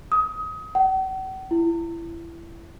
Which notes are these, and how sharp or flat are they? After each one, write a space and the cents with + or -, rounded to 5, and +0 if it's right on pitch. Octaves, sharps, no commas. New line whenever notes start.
D#6 +25
F#5 +45
E4 +25